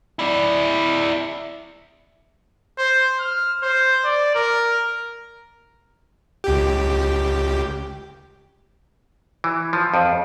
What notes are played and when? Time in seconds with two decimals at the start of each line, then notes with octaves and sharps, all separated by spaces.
0.19 E4 D5
2.78 C5
3.20 F6
3.63 C5
4.05 D5
4.35 A#4
6.44 C#2 G4
9.44 E3
9.73 F3
9.94 F2